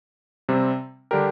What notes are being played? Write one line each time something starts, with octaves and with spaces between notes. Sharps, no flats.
C3 G3 C4
D3 G3 D4 G4 A#4